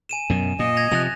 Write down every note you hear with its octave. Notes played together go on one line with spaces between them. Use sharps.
G#5 D#7 E7
F#2 B2
A#2 D#5
G#6 A#6 F7
C3 F3 F#6 A6 F7